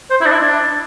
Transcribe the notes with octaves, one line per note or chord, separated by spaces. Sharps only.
C5
E4
D4
E4
D4